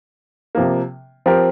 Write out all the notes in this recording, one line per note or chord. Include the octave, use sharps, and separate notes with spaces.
C3 F3 A#3
F3 C4 G4 A#4